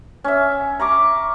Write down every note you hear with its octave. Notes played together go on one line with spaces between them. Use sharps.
C#4 E5
A#5 C#6 D6